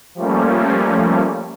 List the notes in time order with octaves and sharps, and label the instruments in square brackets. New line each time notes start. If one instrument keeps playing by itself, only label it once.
[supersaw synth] F3 G3 A3 A#3 C#4